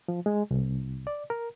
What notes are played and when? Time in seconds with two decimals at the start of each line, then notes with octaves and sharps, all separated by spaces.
0.08 F3
0.26 G#3
0.51 C2
1.07 D5
1.30 A#4